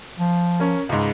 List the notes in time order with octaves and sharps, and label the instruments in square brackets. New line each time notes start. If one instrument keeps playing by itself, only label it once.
[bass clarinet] F3
[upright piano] C#4 A#4
C#2 G#2